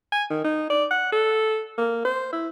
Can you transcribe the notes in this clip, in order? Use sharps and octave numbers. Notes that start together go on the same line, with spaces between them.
G#5
D#3
D#4
D5
F#5
A4
A#3
C5
E4